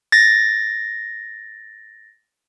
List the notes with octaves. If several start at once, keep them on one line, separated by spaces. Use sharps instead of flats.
A6 A#6